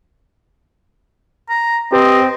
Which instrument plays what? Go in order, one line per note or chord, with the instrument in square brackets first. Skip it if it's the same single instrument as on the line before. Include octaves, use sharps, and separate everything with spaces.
[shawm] A#5
[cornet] C4 [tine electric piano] G4 B4 C5 [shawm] D#5